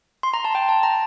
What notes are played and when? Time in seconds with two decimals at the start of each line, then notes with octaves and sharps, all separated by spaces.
0.23 C6
0.34 A#5
0.45 A5
0.55 G5
0.69 A5
0.83 A#5